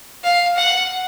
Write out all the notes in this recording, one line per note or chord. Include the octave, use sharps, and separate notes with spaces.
F5
F#5